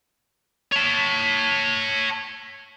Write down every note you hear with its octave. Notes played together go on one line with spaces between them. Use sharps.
C#5 A5